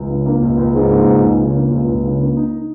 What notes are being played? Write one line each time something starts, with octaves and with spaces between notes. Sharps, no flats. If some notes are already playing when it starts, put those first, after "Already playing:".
Already playing: C#2
C#3
A#3
C#2
C#2
G#2 C#3
A#3
C#2
C#2
C#3
A#3
C#2
C#2
C#3
A#3
D#4